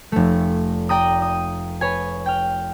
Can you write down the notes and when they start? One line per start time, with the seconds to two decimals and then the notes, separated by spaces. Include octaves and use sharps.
0.12 F1 A3
0.89 D5 G5 A#5 D#6
1.22 D#6
1.81 B4 C#5 G#5
2.26 G5 F6